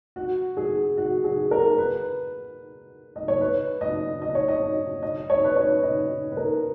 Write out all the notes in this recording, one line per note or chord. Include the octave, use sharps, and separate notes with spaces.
F#4
G#4
F#4
G#4
A#4
B4
D#5
C#5
B4
D#5
D#5
C#5
D#5
D#5
C#5
B4
C#5
D#5
B4
A#4